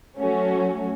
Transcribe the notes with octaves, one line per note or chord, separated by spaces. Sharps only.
F#3 A3 C#4 F#4 C#5